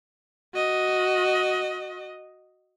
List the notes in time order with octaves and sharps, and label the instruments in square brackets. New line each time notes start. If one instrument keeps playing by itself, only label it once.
[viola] F#4 D#5